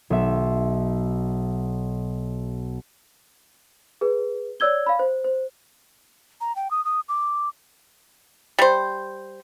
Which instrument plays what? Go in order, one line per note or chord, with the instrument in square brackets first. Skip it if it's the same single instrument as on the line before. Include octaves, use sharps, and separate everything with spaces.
[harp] B1 E5
[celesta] G#4 B4
C#5 D5 E6 G#6 G7
F5 B5
C5
C5
[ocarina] A#5
G5
D#6
D#6
D6
[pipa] G3 C5